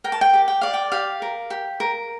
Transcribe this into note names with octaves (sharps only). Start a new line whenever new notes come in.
A#4 G5
A5
G5
G4
G5
D5 F5
G5
G4 F5
A#4
G4
A#4